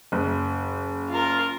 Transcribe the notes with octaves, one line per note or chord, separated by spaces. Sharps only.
F#1
F4 A#4